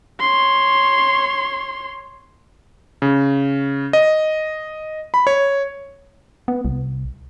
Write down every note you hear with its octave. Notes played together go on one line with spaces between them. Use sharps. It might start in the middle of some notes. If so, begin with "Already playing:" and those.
C#5 C6
C#3
D#5
B5
C#5
B3
C2